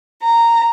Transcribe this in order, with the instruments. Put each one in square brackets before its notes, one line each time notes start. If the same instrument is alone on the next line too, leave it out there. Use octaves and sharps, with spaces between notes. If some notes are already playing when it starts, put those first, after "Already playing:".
[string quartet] A#5